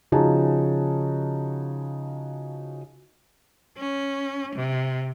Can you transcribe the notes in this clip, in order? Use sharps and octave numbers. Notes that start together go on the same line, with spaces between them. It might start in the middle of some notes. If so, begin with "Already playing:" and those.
C#3 F3 D#4 F#4 G#4 A5
C#4
C3